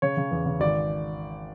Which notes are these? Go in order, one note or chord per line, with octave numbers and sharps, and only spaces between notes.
C#3 C#5
C#3
E2
C#3
G#1 D5